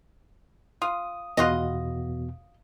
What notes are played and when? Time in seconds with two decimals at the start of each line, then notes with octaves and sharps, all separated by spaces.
0.82 F4 D#6
1.37 E2 B2 F4 F#4 D#5